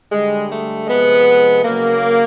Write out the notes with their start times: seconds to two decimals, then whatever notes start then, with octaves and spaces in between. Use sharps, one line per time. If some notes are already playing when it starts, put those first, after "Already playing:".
0.12 D3 G3 G#3
0.50 A3
0.87 C3 F3 G#3 B3
1.64 C#3 F#3 A#3